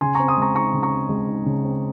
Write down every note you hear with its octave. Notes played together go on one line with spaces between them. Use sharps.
C#3 G#5 C6
C4 A#5 C#6
C6 D#6
G#3 A#5 C#6
D#4 A#5 C#6
C#3
A#5 C#6
C4
G#3
D#4
C#3
C4